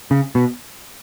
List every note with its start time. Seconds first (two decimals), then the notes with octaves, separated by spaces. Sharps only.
0.11 C#3
0.35 B2